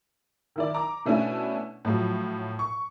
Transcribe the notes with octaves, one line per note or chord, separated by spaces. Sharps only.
D#3 E4 D5
A#5 D6
B2 A3 C#4 D4 E4
A2 F3 F#3
C#6